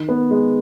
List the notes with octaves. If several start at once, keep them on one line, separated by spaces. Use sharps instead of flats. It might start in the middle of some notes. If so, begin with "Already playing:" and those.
Already playing: D#3
B3
G#3